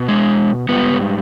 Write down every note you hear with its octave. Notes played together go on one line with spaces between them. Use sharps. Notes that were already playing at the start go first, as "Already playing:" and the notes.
Already playing: B2
G#3
G#2 G3 B3